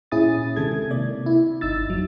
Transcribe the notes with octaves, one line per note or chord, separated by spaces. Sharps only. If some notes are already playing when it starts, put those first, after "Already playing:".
A#2 C#4 E4 G#4 D#6 A6
C3 D#3 G#3 A4 G#6
C3 A#3 D5
E4
G1 D#4 E6 A6
F2 F#3